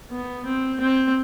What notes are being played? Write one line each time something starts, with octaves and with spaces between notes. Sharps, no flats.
B3
C4
C4